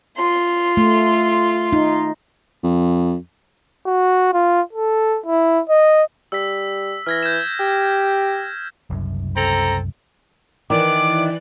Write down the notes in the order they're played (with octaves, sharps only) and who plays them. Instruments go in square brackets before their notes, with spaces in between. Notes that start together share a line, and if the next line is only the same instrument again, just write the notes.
[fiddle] F4 C6
[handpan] A3
D#4
[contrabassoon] F2
[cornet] F#4
F4
A4
E4
D#5
[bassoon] G3 [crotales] E6 B6
[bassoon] E3 [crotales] F6 G#6 A#6
[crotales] G6 G#6 E7
[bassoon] G4
[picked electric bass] F#1 C2 F#2
[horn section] C4 A4 A#5
[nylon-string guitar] D#3 [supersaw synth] E3 D5 F#6 [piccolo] D6